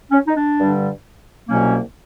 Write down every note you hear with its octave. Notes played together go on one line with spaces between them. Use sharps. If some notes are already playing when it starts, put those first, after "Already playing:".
C#4
D#4
D4
G2 D3 G3
C2 B2 F#3 A#3 C#4